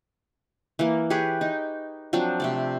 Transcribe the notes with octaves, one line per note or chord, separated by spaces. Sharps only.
E3 A#3
G4 G#4 B4 C#5
D#4
F3 F#3 C4 D4
C3 A3 D5